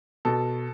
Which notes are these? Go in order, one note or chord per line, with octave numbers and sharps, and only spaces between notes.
B2 A4